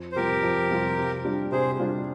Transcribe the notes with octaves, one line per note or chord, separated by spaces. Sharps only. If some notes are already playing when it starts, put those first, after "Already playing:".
Already playing: F2
C5
C3 G3 C4 F4 G4 A#4
F2
C3 G3 C4 F4
C3
G3 D4 F4
C3 G#4 C5
G3 D4 F4